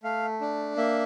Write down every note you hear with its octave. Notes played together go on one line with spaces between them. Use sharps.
A3 F5
D4
A#3 E5